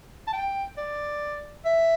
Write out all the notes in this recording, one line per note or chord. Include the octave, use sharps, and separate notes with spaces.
A5
G5
D5
E5